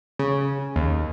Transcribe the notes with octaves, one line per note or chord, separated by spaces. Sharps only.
C#3
D#2